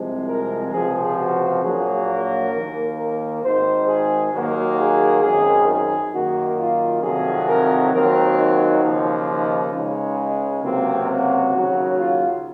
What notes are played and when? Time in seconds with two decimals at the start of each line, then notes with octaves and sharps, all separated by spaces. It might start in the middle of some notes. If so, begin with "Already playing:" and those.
Already playing: C2 C3 F3 G#3
0.28 A#4
0.72 C#2 C3 F3 G#4
1.18 F#4
1.63 A#1 A#2 F#3 A#3 G#4
2.08 A#4
2.52 D#2 D#3 A#3
2.97 A#4
3.42 G#1 G#2 D#3 C5
3.88 G#4
4.33 D#2 D#3 F#3 A#3 F#4
4.78 G#4
5.23 G#1 F#2 D#3 G#4
5.68 G#4
6.13 F#2 D#3 A#3 F#4
6.58 F4
7.03 F2 C3 D#3 F#3 G#4
7.49 A#4
7.93 D#2 D#3 F#3 C4 A#4
8.38 D#4
8.83 D#2 C#3 F3
9.28 D#4
9.74 C#2 C#3 G#3
10.64 C#2 C3 F#3 A#3 C4
11.10 F#4
11.55 D#2 C#3 F#3
11.99 F4